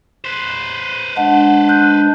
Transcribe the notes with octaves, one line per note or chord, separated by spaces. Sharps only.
B4 C5
G#3 D4 F#5
F#6 G6